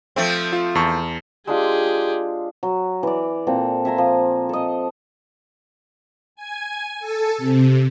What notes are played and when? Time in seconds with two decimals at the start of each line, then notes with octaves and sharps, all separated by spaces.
0.16 F3 A3 C4
0.53 F4
0.75 E2 A5 C#6
1.47 G#3 D4 F4 G4 G#4
2.63 F#3
3.03 E3 D5
3.47 A#2 C4 A4
3.85 E5 G#5 A#5 C6
3.98 F3
4.49 A4 D#5
6.36 G#5
7.00 A4
7.38 C3